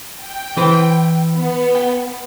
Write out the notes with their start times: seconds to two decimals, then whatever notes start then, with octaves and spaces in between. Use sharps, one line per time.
0.21 G5
0.57 E3 B4 C5
1.37 B3
1.75 G5